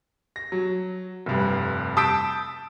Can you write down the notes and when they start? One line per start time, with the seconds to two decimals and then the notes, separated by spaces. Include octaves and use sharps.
0.36 A#6
0.52 F#3
1.26 F1 G2
1.97 A5 D#6 E6 G6 B6 D7